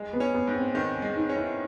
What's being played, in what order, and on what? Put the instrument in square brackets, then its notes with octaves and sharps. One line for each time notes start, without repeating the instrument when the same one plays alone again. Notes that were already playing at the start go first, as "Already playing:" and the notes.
Already playing: [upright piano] G#3
[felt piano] B3
[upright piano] C#4
[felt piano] B3
[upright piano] G#2
[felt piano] C4
[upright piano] D#3 [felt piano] B3
[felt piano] C#4
[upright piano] G#3
[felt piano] D#4
[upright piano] C#4
[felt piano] E4